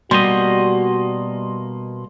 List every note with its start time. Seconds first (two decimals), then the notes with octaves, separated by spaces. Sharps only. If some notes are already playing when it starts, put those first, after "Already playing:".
0.11 B2 G3 A#3 F#4 D#5 C6